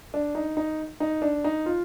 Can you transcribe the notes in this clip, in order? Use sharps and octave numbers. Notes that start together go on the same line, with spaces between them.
D4
D#4
D#4
D#4
D4
D#4
F4